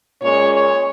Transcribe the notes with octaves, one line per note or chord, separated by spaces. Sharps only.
A#2 G#3 C#4 C#5
C#5